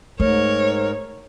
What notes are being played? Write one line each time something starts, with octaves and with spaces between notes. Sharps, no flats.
G#2 A3 A#4 C#5